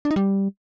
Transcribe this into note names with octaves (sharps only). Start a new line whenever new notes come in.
D4
D#4
G3